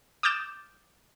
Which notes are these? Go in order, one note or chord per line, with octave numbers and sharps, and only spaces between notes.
D6 D#6 F6 G6 A6 E7